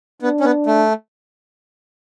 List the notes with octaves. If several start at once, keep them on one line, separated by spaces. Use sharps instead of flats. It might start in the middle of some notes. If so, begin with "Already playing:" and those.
B3 D4
C#4
B3
A3